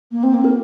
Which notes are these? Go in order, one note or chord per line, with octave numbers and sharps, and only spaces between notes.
A#3
C4
A#3
A#4